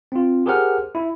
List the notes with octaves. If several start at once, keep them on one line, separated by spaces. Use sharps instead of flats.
C4 F4
G4 G#4 A#4 C5 F#5 F6
E4